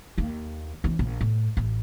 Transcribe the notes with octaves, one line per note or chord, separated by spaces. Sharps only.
D#2 A#3
E3 C#4
A#1
A2
A1